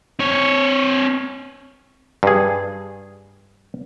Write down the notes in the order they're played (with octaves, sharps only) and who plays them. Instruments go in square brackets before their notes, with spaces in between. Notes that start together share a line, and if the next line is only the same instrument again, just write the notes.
[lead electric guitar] C4 C#5
[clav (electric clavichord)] G2 G#4